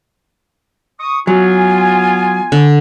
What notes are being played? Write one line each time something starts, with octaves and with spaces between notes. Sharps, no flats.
C#6 D#6
F#3 B3 F4 G#5
D3